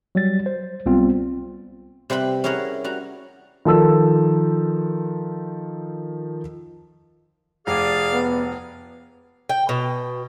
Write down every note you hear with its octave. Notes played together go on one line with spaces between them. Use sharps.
F#3 G3 A6
C5
B1 G3 B3 C4 F4
C3 G3 C4 B4 B5
C#4 E4 G#4 A#4 C#5 F#5
G3 F#4 A#5
D#3 F3 A4 E6
F1 G#4 D5 F5
B3
G5
B2